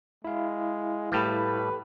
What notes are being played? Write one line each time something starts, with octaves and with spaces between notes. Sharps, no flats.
G#3 E4 F5
A2 G3 A3 G4 A4 B4